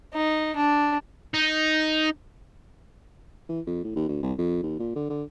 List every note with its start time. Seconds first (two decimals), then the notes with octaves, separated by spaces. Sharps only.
0.14 D#4
0.56 D4
1.34 D#4
3.49 E3
3.67 F2
3.84 A2
3.96 D#2
4.09 D2
4.23 C2
4.38 F2
4.63 D#2
4.79 A#2
4.96 D3
5.10 D3